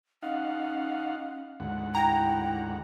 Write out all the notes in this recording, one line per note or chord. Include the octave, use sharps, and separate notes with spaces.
C#4 D#4 F5 F#5
D2 G#2 F#5
E4 G5 A#5